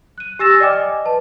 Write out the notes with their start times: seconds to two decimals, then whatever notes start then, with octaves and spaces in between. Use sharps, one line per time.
0.18 F#6 D#7
0.39 G4 G#5 E6 A6 A#6 E7
0.60 D5 D#5 G5 G#5 D6 F6
0.73 D#5
1.06 B4 A5